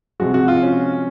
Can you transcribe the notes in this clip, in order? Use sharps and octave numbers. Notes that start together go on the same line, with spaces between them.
C3 F3 G#3 F#4
F#4
F4
C#4